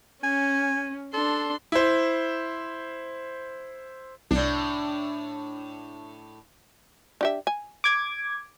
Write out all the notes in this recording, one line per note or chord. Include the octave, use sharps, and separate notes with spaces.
C#4 G#5
D4 A4 C6
E4 C5
C2 A2 D4
D4 G4 E5
G#5
D6 G#6